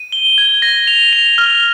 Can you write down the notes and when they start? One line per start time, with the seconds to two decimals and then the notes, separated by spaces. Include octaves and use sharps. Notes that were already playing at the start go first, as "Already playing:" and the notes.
Already playing: D#7
0.12 G7
0.38 G#6
0.62 A#6
0.88 F7
1.13 F7
1.38 F6